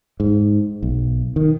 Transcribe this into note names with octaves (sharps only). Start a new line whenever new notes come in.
G#2
B1
D#3